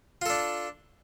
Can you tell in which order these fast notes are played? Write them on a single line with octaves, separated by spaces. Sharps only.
F4 A4 D4